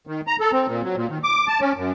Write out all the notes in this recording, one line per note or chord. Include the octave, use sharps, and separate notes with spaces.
D#3
A#5
A4
C4
A#2
F#3
A#2
D#3
D6
A5
C#4
F#2